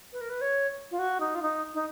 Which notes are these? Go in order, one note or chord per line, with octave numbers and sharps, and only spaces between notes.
B4
A#4
B4
C#5
F4
F#4
D#4
F4
D#4
D#4